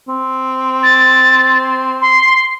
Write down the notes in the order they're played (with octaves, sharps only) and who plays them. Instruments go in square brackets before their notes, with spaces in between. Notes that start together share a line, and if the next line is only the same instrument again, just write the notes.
[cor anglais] C4
[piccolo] A6
C6